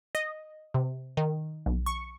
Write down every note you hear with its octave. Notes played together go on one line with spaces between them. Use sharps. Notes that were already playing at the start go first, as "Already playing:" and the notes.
D#5
C3
D#3
B1
C#6